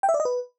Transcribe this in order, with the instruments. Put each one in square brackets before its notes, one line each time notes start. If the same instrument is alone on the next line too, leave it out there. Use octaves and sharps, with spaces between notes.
[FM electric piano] G5
E5
D5
D#5
B4